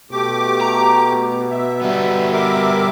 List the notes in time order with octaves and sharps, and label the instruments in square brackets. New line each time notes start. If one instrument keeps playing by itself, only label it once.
[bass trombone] B2 [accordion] A3 G4 D6
[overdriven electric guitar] A#5
[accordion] E5
[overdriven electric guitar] G3 B3
[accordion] A#4 E5 D6